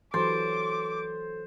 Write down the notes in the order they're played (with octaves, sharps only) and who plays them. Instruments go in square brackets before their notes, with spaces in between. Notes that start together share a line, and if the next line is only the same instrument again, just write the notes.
[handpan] E3 F#3 [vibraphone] A4 [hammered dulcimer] C5 [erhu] D6